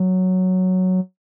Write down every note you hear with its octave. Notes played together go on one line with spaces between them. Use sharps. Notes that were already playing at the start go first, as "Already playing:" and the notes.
Already playing: F#3